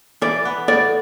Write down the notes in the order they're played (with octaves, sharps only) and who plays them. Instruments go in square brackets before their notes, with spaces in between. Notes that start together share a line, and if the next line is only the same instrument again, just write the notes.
[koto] E3 [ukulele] D5
[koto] B3
[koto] A2 [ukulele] D5